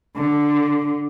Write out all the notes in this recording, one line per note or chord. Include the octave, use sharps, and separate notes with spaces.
D3